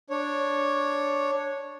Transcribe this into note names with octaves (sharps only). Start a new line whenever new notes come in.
D4 C#5